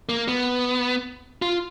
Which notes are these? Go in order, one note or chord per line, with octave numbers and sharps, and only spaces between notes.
A#3
B3
F4